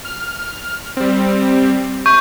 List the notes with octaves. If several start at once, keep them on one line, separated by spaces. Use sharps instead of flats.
F6
G3 C4
C#6 G6